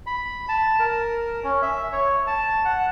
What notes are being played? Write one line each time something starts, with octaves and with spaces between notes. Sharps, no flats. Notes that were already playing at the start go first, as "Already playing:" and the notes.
B5
A5
A#4
C#4
E5
C#5
A5
F#5